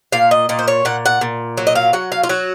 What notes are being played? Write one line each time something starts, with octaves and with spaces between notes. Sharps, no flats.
A#2 F5
D#5
A#2 D#5
C5
C#5
A#2 F#5
F#5
A#2
F#3
D#5
F5
F#3 F#5
F5
F4
F#3 F#4